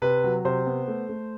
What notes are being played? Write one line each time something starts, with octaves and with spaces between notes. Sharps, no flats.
C3 B4
F#3
C3 C5
B3
A3
A3